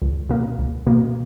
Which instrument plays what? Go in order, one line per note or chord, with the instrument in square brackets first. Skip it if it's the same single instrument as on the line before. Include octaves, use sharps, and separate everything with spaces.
[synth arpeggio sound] C#2
B2 A#3
C#2
B2 A#3